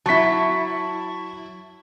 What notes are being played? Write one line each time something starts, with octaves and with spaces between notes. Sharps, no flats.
F#3 E4 A5 C#6 B6